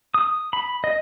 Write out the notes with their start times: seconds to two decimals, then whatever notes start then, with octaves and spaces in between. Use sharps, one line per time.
0.14 D#6
0.53 B5
0.84 D#5